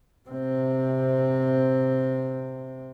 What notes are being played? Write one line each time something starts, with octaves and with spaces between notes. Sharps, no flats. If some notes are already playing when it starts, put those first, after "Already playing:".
C3 C4